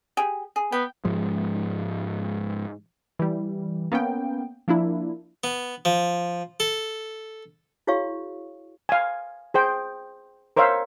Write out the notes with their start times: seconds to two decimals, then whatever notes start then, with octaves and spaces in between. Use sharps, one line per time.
0.17 G4 G#4
0.56 G#4
0.72 B3 G5
1.05 G#2 F3 G#3
3.19 E3 G3
3.92 A#3 B3 C#4 G5
4.68 F3 A#3 D4 E4
5.44 B3
5.85 F3
6.60 A4
7.87 E4 F#4 G#4 C#5 F5 C#6
8.89 F5 G#5
9.54 G#4 C5 G5
10.56 A#4 C5 C#5 E5 F5